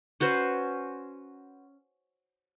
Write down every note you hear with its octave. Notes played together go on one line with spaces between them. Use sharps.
C#4 F#4 B4 C5